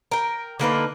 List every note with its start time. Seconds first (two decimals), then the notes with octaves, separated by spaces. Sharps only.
0.11 A#4 G5
0.59 D3 A#3 D#4 B4